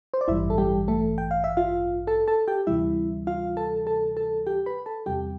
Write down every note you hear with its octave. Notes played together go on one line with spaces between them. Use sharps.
C5
D5
A1 G2 E3 G3 E4 E5
A4
G3 G4
A3 A4
G5
F5
E5
F4 F5
A4 A5
A4 A5
G4 G5
D2 C3 E3 G3 E4 E5
F4 F5
A4 A5
A4 A5
A4 A5
G4 G5
B4 B5
A4 A5
E2 C3 G3 G4 G5